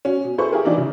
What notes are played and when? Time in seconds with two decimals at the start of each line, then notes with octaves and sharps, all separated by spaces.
0.05 C#4 F#4
0.24 B2
0.38 E4 G#4 A4 B4 C5 C#6
0.52 E4 G4 G#4 A#4
0.65 E3 A#3 D4 D#4
0.77 C#3